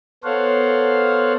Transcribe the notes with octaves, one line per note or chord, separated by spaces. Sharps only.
B3 A4 C5 C#5 F5 F#5